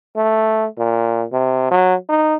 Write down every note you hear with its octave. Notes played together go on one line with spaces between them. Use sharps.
A3
A#2
C3
F#3
D#4